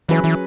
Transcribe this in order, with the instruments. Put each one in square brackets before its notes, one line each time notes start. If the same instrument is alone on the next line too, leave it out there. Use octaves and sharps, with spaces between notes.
[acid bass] E3 [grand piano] F#3 C#4 G#4 B4
[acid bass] E3